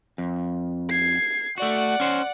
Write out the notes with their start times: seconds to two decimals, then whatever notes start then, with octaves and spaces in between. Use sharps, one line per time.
0.18 F2
0.90 G#6 C7
1.58 A3 F#4 D5 F#5
2.00 C#4 C5